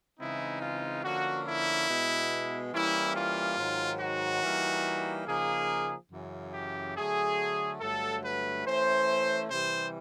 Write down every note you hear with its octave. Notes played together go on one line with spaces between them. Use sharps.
C#3 E3 G#3 C4 D#4 E4
F4
D3 F3 A#3 C#4 F#4
E4
B2 G#3 B3
E3 G3 A#3 C#4 E4
F4
G#2 D#3 F#3
F#4
E3 G3 A#3 D#4
C#3 F3 A#3 D#4 G#4
F#2 C#3 E3
G4
D3 F#3 A3 G#4
G2 D3 F#3 A3 A4
B4
E3 A3 C#4 C5
C3 E3 G3 C5